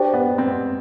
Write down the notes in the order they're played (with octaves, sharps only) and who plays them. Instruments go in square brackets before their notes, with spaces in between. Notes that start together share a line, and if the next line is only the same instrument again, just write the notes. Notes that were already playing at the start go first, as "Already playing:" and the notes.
Already playing: [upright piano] D4 [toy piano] G4 C5 G5
[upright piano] B3
C4